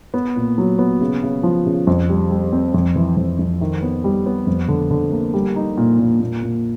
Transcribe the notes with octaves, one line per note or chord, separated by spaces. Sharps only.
B3
A#2
F#3
B3
C#3
C#3
F3
C#3
F2
G3
G3
C4
F2
E3
F2
F2
D#3
B3
G3
B3
F2
D3
D3
A#3
G3
D#4
A#2
A#2
A#2
A#2